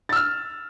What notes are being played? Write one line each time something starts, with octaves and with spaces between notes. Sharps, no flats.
E6 F6 A6